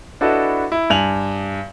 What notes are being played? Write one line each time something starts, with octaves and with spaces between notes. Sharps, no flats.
D4 E4 F#4 A4 B4 D#5
E4
G2 G#5 F7 F#7